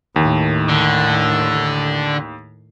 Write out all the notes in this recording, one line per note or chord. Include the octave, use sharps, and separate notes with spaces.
D#2 A2 D#3
D3